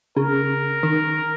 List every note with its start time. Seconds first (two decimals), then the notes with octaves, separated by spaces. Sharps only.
0.16 C#3 A#4
0.83 D#3